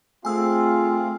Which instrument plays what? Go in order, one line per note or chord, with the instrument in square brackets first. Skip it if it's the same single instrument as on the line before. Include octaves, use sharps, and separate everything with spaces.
[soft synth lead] A3 [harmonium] C4 G#4 F5 [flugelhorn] F4 [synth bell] G#5 E6